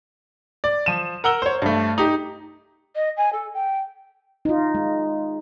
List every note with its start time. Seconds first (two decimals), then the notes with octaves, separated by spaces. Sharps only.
0.64 D5
0.86 F3 D#7 E7
1.24 A#4 F#5 E6 G7
1.42 C5 C#5
1.62 G2 A3
1.98 D#4 G4
2.95 D#5
3.16 G#5
3.32 A4
3.53 G5
4.45 D#4 F4
4.75 G#3